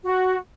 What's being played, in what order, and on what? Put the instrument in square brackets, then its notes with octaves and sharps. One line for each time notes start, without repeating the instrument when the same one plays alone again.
[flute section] F#4